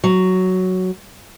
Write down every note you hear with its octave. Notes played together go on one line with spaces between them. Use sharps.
F#3